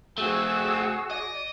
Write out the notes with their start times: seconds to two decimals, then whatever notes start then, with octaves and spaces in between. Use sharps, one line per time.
0.18 A3 C4 F#4 G#4 E6
1.11 D5 D#5